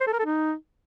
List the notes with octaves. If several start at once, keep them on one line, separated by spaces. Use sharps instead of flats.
C5
A4
A#4
A4
D#4